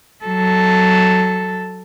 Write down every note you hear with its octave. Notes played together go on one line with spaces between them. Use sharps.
F#3 A4